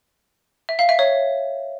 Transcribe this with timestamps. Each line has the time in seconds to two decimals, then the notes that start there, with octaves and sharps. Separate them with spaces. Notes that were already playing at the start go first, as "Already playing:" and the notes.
0.69 E5
0.79 F5
0.89 E5
0.99 C#5